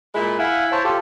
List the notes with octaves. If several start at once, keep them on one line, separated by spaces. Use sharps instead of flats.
A#2 G#3 E4 B5
E4 F5 F#5 G#5
C5 C#5 A5
F4 G4 A4